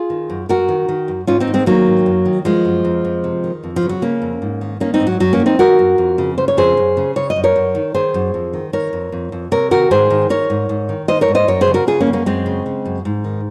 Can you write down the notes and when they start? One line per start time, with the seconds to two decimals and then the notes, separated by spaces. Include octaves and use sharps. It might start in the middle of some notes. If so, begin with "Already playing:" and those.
Already playing: F4 G#4
0.10 D#3
0.30 F#2
0.49 F#2 F#4 A#4
0.69 D#3
0.88 D#3
1.08 F#2
1.27 G#2 C#4 F4
1.40 C4 D#4
1.47 D#3
1.54 G#3 C4
1.66 D#3 F#3 A#3
1.87 G#2
2.06 F#2
2.26 D#3
2.45 D#3 F3 G#3
2.65 F#2
2.85 F2
3.05 F2
3.24 C3
3.44 D#3
3.64 F2
3.76 F3
3.83 C#3
3.89 F#3
4.02 C#3 A#3 C#4
4.22 F2
4.42 G#2
4.61 D#3
4.80 D#3 A#3 C#4
4.94 C4 D#4
5.00 G#2
5.07 F#3
5.20 F#2 F#3
5.33 A#3 C#4
5.40 D#3
5.46 C4 D#4
5.59 D#3 F#4 A#4
5.79 F#2
5.98 F2
6.18 C#3
6.38 C#3 C5
6.48 C#5
6.57 F2 G#4 C5
6.77 F#2
6.97 C#3
7.16 C#3 C#5
7.30 D#5
7.36 F#2
7.44 A#4 C#5
7.56 F#2
7.75 D#3
7.94 D#3 G#4 C5
8.14 F#2
8.34 F2
8.54 D#3
8.73 D#3 A#4 C#5
8.93 F2
9.12 F2
9.32 F2
9.52 C3 A#4 C#5
9.71 D#3 F#4 A#4
9.91 G#2 G#4 C5
10.10 D#3
10.29 D#3 A#4 C#5
10.50 G#2
10.69 G#2
10.89 D#3
11.08 D#3 C5 D#5
11.21 A#4 C#5
11.28 G#2
11.35 C5 D#5
11.48 F#2 A#4 C#5
11.61 G#4 C5
11.67 C#3
11.74 F#4 A#4
11.87 C#3 F4 G#4
12.00 A#3 C#4
12.07 F#2
12.13 A#3 C#4
12.26 F#2 G#3 C4
12.46 C#3
12.66 C#3
12.86 F#2
13.05 G#2
13.24 D#3